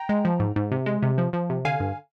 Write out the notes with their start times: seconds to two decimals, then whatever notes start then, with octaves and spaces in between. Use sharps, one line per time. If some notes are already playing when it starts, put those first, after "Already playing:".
Already playing: G5 A#5
0.09 G#3
0.25 F3
0.40 G#2
0.56 G#2
0.72 C3
0.86 G#3
1.02 C3
1.18 F3
1.33 F3
1.50 C3
1.65 D3 F5 G#5
1.80 G2